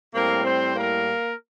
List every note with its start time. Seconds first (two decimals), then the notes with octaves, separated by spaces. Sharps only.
0.14 A2 G3 A#3 C4 A#4
0.44 C4 C5
0.75 A#3 A#4